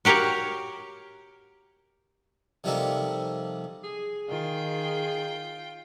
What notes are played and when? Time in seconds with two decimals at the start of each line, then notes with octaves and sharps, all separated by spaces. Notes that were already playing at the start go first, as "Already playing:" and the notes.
0.05 F#4 G4 A#4 C#5 F5
2.64 C3 F3 G3 A#3 D#4 A4
3.84 G#4
4.28 D#3 F4 G5